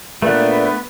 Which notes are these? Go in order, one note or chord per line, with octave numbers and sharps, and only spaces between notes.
A#2 A3 B3 D4 B4